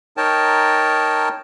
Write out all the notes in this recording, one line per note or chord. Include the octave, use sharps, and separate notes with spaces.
D#4 A#4 C#5 G5 A5